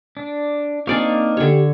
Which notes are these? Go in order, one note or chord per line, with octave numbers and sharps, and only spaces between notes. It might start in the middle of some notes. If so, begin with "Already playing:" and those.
D4
A#3 C4 D4 D#4 D5 F5 C#6
D3 G4 C#5